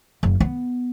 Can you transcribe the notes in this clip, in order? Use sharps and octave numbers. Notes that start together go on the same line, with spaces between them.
F#1
B3